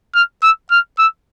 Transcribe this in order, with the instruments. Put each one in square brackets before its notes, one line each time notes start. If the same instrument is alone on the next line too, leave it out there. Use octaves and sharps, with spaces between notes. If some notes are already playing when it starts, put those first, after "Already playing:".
[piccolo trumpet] F6
E6
F6
E6